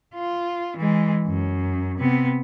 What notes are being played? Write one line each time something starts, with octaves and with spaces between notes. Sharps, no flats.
F4
E3 G#3
F#2
C3 B3